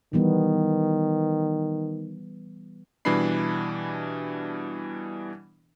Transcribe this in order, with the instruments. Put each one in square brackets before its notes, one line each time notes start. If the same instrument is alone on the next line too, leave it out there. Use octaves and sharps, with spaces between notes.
[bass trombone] D#3 [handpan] E3 G3 B3
[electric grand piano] B2 E3 G3 D4 B5 C7